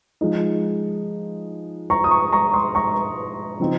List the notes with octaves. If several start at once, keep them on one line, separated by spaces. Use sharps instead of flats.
F3 G#3 D#4
A#5 C#6
D#6
A#5 C#6
A#5 C#6
C6 D#6
A#5 C#6
C#3 F3 C4 D#4